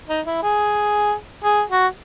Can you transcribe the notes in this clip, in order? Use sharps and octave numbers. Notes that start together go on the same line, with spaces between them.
D#4
E4
G#4
G#4
F#4